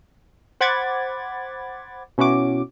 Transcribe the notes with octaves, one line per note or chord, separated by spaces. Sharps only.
C5 F#5 B5 D6 G#6 A6
B2 C#4 E4 F#4 D6